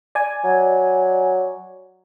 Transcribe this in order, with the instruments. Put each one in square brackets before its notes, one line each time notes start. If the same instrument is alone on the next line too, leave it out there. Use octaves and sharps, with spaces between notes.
[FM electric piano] D5 G#5
[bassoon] F#3